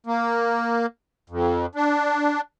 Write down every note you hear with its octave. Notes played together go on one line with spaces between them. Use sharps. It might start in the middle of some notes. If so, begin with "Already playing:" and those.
A#3
F2
D4